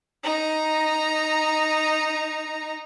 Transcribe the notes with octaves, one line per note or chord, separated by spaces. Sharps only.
D#4 A#5